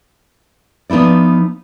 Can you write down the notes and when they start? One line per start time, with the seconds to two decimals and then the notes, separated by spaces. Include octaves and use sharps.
0.90 F3 B3 D#4 E4 D5